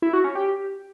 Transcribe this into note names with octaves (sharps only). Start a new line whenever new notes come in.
E4
F#4
C#4
G4